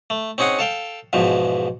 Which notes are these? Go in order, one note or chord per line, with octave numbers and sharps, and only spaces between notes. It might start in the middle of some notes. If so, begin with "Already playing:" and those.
A3
C4 C#4 D#4 G#4 F#5
A4 F5 G5
E2 G#2 B2 F3